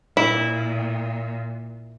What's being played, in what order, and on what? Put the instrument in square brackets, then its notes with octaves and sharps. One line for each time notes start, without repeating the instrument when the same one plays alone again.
[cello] A#2 [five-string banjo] E4